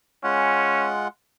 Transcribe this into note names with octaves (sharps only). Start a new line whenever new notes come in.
G#3 C#4 F4 F#5